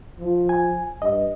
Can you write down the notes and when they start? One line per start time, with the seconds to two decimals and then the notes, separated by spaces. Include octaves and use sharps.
0.20 F3
0.49 G#5
1.02 G2 D#5